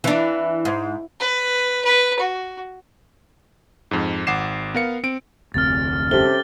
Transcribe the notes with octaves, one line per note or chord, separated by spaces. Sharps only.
E3 D4
G#2
B4
B4
F#4
F2 G#2
G#1 F#5 D6 C7 E7
B3 A#4 F5 C#7
C4 D7
F1 D2 C4 F6 A6
C3 C#4 G4 A4 G7